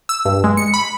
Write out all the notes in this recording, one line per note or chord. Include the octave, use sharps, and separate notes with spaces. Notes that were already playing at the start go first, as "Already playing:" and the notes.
E6
G2
G#3
C#7
B5